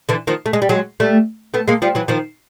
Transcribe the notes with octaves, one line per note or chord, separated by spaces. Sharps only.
D3 E3
D#3 F3
A3
G#3
G3
F#3 G#3
G3 A3
A3 B3
G#3 A#3
F3 G3
E3 F#3
D#3 F3